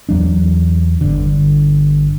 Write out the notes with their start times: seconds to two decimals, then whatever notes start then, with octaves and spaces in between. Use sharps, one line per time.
0.09 E2 F#3 D4
1.01 G1 D3